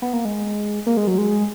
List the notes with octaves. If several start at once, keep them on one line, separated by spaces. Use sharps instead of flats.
B3
A#3
G#3
A#3
G#3
F#3
G#3